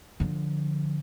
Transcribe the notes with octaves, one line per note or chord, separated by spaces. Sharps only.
D3 F3